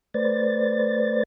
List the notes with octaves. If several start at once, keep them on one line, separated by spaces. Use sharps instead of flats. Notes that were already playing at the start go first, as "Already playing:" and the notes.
A3 B4 C5 D5 A6